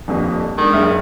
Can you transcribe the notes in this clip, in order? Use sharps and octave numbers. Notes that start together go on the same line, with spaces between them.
D#1 A#1 F2
D#3 G#3 D4
F#1 E5 F6